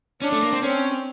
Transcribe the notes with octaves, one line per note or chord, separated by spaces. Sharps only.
C#4 D4
A3
A#3
C4
C4 C#4